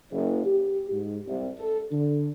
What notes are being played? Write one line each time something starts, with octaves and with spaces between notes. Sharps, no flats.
F#1
G4
G#2
C2
A4
D3